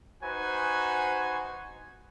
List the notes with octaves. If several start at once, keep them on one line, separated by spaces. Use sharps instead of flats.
D#4 F#4 B4 C5 G#5